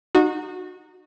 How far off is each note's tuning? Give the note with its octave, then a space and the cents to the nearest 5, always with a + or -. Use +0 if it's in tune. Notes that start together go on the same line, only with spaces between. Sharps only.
D#4 -25 F#4 -20